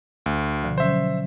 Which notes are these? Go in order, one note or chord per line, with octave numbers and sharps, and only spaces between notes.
D2
B2 D3 F3
F#3 C#4 C5 E5